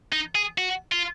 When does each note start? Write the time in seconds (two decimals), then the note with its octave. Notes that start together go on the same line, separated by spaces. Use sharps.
0.12 D#4
0.35 G#4
0.58 F#4
0.92 F4